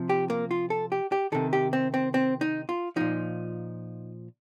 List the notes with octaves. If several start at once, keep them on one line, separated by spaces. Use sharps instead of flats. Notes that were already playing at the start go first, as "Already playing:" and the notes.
Already playing: C3 F3
G4
A#3
F4
A4
G4
G4
C3 D#3 A4
G4
C4
C4
C4
D#4
F4
A#2 F3 D#4